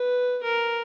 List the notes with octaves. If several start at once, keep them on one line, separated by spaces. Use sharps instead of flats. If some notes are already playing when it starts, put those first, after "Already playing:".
Already playing: B4
A#4